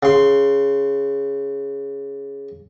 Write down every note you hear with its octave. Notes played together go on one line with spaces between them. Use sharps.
C#3 C6